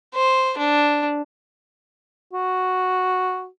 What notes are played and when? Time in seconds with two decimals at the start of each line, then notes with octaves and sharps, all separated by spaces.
0.15 C5
0.58 D4
2.33 F#4